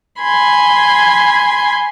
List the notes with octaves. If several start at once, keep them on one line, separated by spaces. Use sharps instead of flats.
G#5 B5 C6 G#6